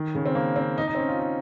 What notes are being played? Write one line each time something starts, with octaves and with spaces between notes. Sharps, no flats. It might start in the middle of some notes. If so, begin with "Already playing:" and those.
Already playing: D#3
C#3
C4
A#3
C4
D#4
D#4
C4
C#4
F4
D#4